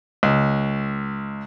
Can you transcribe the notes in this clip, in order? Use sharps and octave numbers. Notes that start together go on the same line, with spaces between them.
C#2